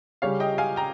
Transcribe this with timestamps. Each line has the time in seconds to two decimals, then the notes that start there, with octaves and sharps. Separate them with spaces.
0.22 C#3 G3 C#4 G4 C#5 F5
0.40 D#5 G5
0.58 F5 G#5
0.76 G5 A#5